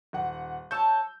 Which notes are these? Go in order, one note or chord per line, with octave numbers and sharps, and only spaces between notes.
D#1 F#5
C#5 A5 E6 G6